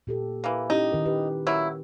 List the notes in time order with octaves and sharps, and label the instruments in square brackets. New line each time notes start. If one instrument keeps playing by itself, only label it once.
[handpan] A#2 G4 A4
[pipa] E3 A#3
[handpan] C#4 E4 G4 [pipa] D#4
[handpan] D#3 A#4
G4 B4
[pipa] F#3 A#3 E4